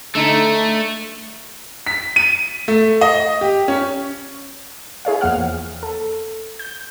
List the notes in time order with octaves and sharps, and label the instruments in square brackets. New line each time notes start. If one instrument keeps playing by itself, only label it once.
[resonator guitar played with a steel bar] D3 D#4 [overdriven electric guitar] A3
[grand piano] B6
D#7
A3
D#5
G4
C#4
[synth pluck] E4 G#4 C#5 F5
E2 F3 A#3 F#5 F6
A4
G6